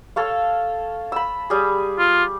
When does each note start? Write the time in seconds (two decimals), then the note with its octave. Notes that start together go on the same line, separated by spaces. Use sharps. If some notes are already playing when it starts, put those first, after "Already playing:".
0.16 A4 C#5 F5
1.12 B5 E6
1.50 G3 G#4
1.99 F4